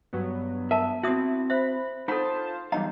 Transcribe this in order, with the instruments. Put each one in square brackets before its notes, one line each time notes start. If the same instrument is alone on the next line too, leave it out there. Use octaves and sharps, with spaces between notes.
[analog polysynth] G2 F#3 B3
[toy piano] A#4 A5 [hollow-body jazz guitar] E5
[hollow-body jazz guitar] C4 F#4 [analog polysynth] E4 [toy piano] E5 D#6
[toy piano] C5 E5 [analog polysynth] B5
[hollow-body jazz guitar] D#4 B5 [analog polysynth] F4 C5 A5 [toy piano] A4 F#5
[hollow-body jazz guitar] E2 D#4 F5 [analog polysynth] F#3 G3 [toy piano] D#5 A#5